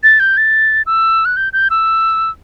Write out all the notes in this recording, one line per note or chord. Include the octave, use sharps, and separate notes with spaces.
A6
G6
A6
E6
F#6
G6
G6
E6